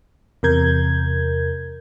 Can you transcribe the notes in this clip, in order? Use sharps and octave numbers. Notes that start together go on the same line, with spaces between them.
E2 C3 A#4 G6 G#6